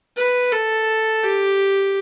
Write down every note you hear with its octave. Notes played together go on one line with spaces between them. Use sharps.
B4
A4
G4